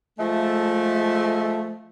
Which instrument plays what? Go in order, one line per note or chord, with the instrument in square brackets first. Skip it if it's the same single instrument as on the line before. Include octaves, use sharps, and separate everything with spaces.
[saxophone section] F3 G#3 A3